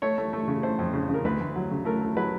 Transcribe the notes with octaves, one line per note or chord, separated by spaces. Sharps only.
A3 C#5
A3
A3
C#3
A3 C5
F2
C#3
C#3
A#4
D2 B4
D2
F#3
C#3
A3 A#4
A3
F#3 B4